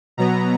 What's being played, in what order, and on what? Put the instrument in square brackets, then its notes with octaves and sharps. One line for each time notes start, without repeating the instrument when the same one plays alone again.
[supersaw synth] B2 F#3 B3 A#5